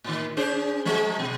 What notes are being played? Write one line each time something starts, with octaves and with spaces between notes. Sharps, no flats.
A2 D#3
C#4 G#4 C5
F3 G#3
B2